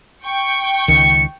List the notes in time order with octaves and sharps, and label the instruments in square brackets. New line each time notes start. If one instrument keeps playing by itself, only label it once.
[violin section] G5 C#6
[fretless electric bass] C#2 D#3 [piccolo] C#7